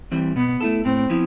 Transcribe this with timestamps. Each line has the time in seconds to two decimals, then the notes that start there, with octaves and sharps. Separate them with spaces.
0.12 E3 G3 C4
0.36 B2 B3
0.61 A3 E4 A4
0.85 A2 C4
1.10 F3 B3 E4